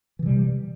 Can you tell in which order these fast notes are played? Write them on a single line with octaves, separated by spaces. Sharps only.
E3 C3 G3